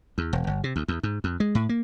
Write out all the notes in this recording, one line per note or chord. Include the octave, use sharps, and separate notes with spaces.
E2
E1
G1
C3
D2
E2
G#2
F2
G#3
A2
A#3